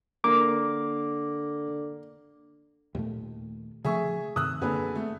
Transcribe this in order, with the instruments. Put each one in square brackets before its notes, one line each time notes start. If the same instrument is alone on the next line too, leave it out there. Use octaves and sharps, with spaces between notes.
[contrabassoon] D3 [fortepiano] A#3 [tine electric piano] D6
[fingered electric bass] D#2 A#2 A3
[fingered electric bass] C#3 F3 A3 [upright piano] G#4 E5 C#6
[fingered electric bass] G2 C3 D#3 [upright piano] D#6 E6 F#6
[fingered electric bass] F#2 A#3 [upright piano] D3 G#4 B4
[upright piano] A3